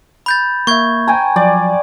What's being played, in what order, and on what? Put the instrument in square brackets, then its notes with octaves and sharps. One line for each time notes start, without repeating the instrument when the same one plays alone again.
[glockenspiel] B5 G6 A6
[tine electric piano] A#3 E5 [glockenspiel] C#6 G#6
[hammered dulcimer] G5 G#5 A#5
[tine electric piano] F3 F#3 [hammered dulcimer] D5